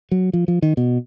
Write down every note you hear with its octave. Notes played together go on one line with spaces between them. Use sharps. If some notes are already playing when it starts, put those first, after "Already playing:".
F#3
F3
F3
D#3
B2